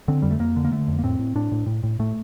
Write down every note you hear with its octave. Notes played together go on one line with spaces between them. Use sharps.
D3 C4
F2 G3
A3
F2 A#3
D3
A#3
D3 A3
F2
A#3
A2 C4
A2
A2 D4
A2
A2
A2
A2 A3